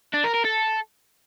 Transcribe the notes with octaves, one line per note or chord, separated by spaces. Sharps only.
D4
A#4
A#4
A4